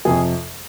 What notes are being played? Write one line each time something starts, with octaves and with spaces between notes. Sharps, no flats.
F2 C3 F3 G#4